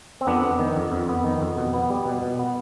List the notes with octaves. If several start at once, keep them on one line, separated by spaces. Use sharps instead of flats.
C4
F2 B3 D4
B3
D#3
F2
F2
B3
D#3
F2
B2
B3
G3
B2
B2
B3